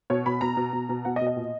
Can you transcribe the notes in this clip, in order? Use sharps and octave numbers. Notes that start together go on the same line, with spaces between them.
B2 C#5
B2 B5
B2 A#5
B2
B2
B2
B2 F#5
D#5
B2
D#5
A#2